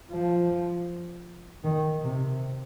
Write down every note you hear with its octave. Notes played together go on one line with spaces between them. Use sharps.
F3
D#3
C3